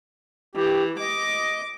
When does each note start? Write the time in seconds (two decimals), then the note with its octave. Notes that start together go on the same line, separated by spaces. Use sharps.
0.55 E3 G4
1.01 D#5 D6